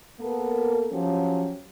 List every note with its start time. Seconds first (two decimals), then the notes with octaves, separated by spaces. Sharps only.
0.20 A#3 B3 A4 A#4
0.92 F3 F#3 C#4 G4